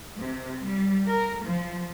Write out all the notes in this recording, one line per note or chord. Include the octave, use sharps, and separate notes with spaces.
C3
G3
A#4
F3